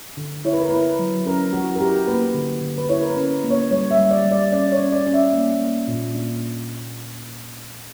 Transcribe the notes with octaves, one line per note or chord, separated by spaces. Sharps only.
D3
E4 C#5
B4
A#4
E4 B4
F#3
C#4 A#4
E3 F#4
A#4
E4 G4
A#3 B4
D3
D3
B4
E4 C#5
A#4
B4
C#4
A#3
C#5
G3 C#5
E5
G3
D5
G3
D5
C#4 D5
C#5
C#4
D5
C#4
E5
A#3
A#3
A#2
D4